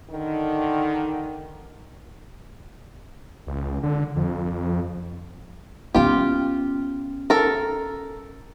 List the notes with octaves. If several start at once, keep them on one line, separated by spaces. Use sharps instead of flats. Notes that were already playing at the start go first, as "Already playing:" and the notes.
D3 D#3
C#2
D3
F2
B3 C#4 F4 G4
A4 A#4